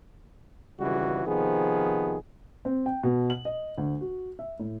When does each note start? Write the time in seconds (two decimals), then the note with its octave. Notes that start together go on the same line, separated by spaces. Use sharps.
0.80 G#1 C#2 C#3 E3 G3 F#4
1.26 C3 D#3 F3 B3 G#4
2.65 C4
2.86 G5
3.03 B2
3.30 F#7
3.45 D#5
3.78 D2
4.01 F#4
4.39 E5
4.59 A2